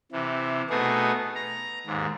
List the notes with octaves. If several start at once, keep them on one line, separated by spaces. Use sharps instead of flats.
C3 E3
B2 A3 B3 D#4 G#4
A#5
D#2 G#2